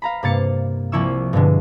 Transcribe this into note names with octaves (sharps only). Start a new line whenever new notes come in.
F5 A#5 B5
G2 C3 A#3 F5 A6 C#7
C2 F3 A#3 E4 C#6 E6
G2 B2 D3 G#3